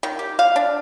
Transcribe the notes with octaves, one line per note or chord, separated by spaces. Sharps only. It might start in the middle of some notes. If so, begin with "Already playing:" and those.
D#3
G4
F5
D4